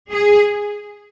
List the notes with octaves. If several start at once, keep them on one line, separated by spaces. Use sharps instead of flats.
G#4